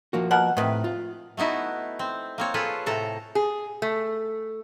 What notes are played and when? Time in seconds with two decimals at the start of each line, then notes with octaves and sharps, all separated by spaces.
0.13 F3 A#3 F#4
0.31 B2 A#4 F#5
0.57 A2 C3 D#3 B4
0.84 F4
1.37 A3 B3 D#4 E4 F#4
1.99 C4
2.38 A#3 C4 C#5
2.54 F4 G#4 A4 B4 C#5
2.86 A2 C3 A4 A#5
3.35 G#4
3.82 A3